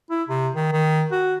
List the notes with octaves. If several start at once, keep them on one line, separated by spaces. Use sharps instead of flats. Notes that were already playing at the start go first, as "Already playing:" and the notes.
E4
C3
D#3
D#3
F#4